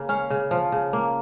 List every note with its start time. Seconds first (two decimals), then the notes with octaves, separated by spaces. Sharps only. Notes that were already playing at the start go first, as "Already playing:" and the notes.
Already playing: C#3 A#3
0.09 C#4 F5
0.30 C#3
0.51 F3
0.72 C#3
0.93 A#3